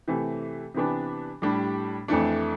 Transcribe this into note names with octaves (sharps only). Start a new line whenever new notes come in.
C3 E3 A3
C3 E3 B3 D4 G4
A2 G3 D4 G4
F2 E3 A3 D4